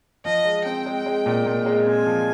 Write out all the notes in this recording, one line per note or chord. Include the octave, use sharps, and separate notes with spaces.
F3 D#5
G#3
C4 G5
G#3
G#3
A#2
A#2
G#3
C4 G#5
F3